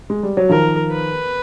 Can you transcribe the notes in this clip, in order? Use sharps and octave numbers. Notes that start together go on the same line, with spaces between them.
G#3
G3
F#3
D#3 F3 A#4
B4